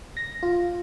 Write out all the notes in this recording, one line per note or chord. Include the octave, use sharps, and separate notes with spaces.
A#6
F4